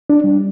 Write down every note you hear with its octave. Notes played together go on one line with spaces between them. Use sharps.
D4
G3